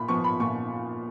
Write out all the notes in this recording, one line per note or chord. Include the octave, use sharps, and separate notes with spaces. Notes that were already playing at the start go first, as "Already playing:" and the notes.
Already playing: A#2 B5
F3 B3 C#6
B5
A#2 C#6